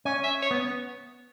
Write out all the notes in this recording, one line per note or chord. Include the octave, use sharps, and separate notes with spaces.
C#4 G#5
E5
C#5
B3